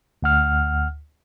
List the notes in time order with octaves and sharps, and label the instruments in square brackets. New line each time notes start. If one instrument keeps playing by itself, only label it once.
[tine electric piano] D2 F#5 F6